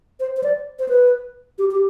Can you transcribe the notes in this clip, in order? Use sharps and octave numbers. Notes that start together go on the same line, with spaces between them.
C5
C5
D5
C5
B4
G4
G4